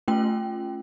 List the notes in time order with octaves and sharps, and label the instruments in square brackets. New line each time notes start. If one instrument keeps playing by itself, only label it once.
[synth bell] A3 C#4 F4 G5